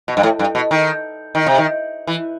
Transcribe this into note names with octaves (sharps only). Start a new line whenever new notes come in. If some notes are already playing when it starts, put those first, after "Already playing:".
B2
G2
A2
G2
B2
D#3
D#3
C3
D#3
E3